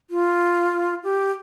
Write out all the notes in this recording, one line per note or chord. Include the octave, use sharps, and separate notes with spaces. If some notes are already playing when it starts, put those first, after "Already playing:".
F4
G4